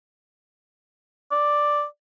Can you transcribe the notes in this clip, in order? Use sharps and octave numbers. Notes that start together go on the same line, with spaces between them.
D5